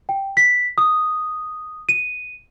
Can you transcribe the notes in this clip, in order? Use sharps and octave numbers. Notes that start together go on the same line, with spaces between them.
G5
B6
D#6
D#7